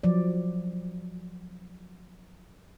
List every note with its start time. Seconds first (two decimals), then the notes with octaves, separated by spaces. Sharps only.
0.03 F3 F#3 D5